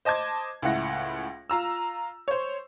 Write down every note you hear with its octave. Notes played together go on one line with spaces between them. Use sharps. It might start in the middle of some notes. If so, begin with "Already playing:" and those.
C5 D#5 A5 D6 G#6
C#2 A2 E4 F#5 A#6
F4 A#5 E6
C5 C#5